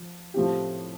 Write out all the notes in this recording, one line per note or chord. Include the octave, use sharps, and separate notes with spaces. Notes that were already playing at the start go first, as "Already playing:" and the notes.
Already playing: F3
A2 F3 A3 C4 G4